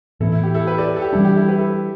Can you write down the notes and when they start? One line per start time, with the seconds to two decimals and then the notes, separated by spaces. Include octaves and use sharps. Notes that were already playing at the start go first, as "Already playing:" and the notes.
0.20 A2 E3 B3 E4 A4
0.32 E4
0.43 G4
0.54 E4 A4
0.66 G4 B4
0.78 A4 D5
0.96 A4
1.02 G4
1.13 E3 G3 D4 E4
1.25 G4
1.36 E4 A4
1.48 G4 B4
1.59 E4 A4